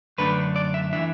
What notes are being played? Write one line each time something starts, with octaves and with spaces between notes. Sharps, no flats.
F#2 D3 A3 D4 B4
D5
E5
E3 D4 E5